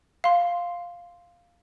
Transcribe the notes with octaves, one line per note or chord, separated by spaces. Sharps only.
F5 C6